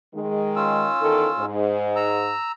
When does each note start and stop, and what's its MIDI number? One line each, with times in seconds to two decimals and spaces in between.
0.15 0.88 51
0.15 0.88 56
0.56 1.45 61
0.56 1.45 65
0.56 1.45 88
1.01 1.26 40
1.01 1.26 51
1.01 1.26 69
1.39 2.33 44
1.96 2.52 82
1.96 2.52 88